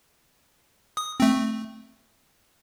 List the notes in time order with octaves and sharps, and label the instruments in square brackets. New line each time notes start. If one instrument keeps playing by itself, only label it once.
[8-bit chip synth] D#6
A3 C4